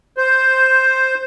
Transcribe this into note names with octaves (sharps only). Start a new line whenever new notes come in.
C5